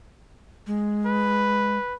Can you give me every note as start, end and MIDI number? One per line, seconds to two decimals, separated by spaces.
0.67 1.78 56
1.06 1.94 71